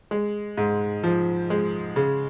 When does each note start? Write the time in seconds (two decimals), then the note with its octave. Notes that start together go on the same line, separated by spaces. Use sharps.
0.11 G#3
0.57 G#2
1.04 F3
1.50 G#3
1.96 C#3